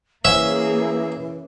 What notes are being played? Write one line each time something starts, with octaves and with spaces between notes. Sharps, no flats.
E3 A#3 C#4 G#4 E5